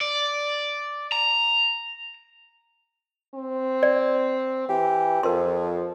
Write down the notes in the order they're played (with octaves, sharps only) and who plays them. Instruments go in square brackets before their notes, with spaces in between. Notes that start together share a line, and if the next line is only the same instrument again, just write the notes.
[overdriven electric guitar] D5
A#5
[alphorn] C4
[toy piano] D5
[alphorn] E3 [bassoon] G4
[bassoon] F2 [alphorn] F3 [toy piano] A#4 C6